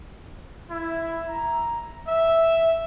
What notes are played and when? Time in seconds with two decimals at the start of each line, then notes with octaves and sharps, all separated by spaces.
0.70 E4
1.28 A#5
2.07 E5